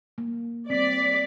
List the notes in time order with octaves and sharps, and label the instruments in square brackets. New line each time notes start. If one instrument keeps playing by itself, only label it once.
[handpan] A#3
[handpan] G3 C4 [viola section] D5 [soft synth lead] B6